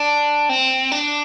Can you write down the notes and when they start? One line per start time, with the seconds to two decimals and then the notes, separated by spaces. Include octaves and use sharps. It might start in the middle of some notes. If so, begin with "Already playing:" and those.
Already playing: D4
0.49 C4
0.92 D4